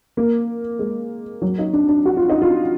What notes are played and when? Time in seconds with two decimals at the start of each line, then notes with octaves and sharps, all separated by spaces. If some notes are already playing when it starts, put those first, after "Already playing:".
0.17 A#3
0.79 G#3
1.42 F#3
1.59 D#4
1.73 D4
1.89 D4
2.05 F#4
2.17 F4
2.30 D#4
2.42 F4